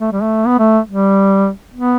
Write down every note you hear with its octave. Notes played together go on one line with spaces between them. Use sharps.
A3
G3
A3
B3
A3
G3
B3